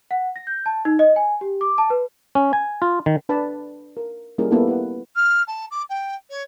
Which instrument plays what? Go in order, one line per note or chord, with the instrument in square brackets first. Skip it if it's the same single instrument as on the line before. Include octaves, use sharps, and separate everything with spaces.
[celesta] F#5
A#6
G6
A5
D#4
D#5
G#5
G4
D6
A5
B4
[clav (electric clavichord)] C#4
G#5
F4
D#3
[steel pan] D4 B4 D5 A5 B5
A#4
G3 A#3 C#4 E4 G#4 A#4
A#3 B3 E4 G4 A4
E4 B4 F#5
[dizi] F6
A5
D6
G5
C#5